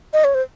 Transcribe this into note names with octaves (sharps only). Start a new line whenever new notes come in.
D#5
C#5
C5